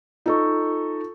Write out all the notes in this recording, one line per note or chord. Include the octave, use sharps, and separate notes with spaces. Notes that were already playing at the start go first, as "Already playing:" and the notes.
D#4 F4 A4 C#6